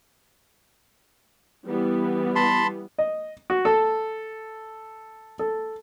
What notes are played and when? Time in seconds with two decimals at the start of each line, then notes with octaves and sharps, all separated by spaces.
1.67 E3 G3 B3
2.36 A5 B5 C6
2.98 D#5
3.50 F#4
3.65 A4
5.39 A4